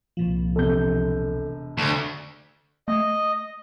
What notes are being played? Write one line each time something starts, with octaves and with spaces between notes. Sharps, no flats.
C2 A#2 F3
E1 C3 A4 G6
D2 A5
A3 D#5